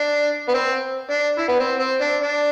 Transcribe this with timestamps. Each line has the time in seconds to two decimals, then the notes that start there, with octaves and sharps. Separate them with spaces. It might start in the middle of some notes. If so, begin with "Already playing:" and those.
Already playing: D4
0.49 B3
0.54 C4
1.10 D4
1.38 E4
1.48 B3
1.59 C4
1.79 C4
2.01 D4
2.22 D4